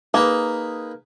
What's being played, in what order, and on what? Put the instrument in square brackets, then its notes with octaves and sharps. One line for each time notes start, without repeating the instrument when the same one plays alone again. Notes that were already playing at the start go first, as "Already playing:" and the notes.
[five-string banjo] A#3 [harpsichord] D#4 G#4 B4